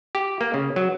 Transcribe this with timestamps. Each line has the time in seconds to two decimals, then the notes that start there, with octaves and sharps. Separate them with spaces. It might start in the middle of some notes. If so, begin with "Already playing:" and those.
0.15 G4
0.41 A#3
0.54 C#3
0.76 F#3